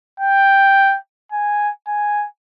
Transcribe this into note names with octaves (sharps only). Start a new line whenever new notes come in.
G5
G#5
G#5